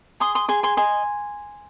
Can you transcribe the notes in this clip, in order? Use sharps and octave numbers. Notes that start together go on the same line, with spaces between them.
G#4 C6 D#6
C6 D#6
G#4 G#5 C6
G#5 C6
D#5 G#5 C6